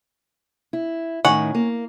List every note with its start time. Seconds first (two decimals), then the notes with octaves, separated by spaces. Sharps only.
0.73 E4
1.25 A2 D#3 C#4 F#5
1.55 A#3